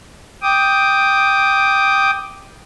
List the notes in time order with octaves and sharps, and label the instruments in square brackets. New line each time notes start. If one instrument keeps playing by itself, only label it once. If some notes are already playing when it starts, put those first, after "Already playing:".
[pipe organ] G5 D6 D#6